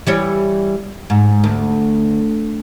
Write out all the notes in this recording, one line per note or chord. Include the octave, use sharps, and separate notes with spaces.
E3 G3 C#5
G#2
D2